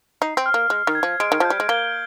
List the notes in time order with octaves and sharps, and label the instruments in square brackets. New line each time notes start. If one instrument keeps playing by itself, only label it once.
[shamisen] D#4 [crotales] C7
[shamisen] C4
[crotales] F6
[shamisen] A#3
[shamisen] G#3 [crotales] F6
[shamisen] D#3
[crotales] G#6
[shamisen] F3
[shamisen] G#3 [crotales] D7
[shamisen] D#3
[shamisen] F3 [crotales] G6
[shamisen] G3
G#3
[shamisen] A#3 [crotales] G7